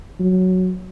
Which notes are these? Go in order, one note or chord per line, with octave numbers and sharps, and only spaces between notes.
F#3